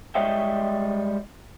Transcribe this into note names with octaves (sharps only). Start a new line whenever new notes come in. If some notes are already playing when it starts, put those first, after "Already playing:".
G3 G#3 C#5 D#5 E5 G5